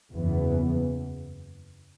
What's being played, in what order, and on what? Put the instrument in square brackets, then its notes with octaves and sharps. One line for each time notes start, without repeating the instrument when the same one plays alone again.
[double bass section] F#1 E2 C#3 E3 B3